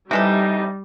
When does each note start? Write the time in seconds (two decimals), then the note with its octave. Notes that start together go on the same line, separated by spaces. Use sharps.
0.11 C3 E3 G3 D#4 A4